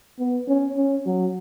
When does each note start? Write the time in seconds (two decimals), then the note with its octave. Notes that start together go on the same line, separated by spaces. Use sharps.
0.19 B3
0.48 C#4
0.77 C#4
1.06 F#3